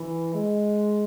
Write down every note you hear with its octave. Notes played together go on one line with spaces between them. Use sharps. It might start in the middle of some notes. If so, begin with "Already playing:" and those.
Already playing: E3
G#3